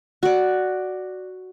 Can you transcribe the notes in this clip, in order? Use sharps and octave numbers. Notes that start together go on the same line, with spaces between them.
F#4 D5